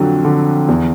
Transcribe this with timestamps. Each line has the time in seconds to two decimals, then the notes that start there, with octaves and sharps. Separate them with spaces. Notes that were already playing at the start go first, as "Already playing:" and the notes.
Already playing: F2 D3 F#3
0.25 D3
0.68 E2